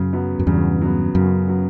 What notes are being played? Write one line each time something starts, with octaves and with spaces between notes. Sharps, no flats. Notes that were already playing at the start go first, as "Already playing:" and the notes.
Already playing: F#2 C#3
F#3 B3
F#2
E2 G2 C#3
F#3 B3
F#2 C#3
F#3 B3